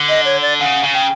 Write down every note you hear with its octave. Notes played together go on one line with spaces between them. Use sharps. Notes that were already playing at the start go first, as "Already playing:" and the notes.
Already playing: D3
D#5
C#5
D5
C#3 F#5
C#3
G5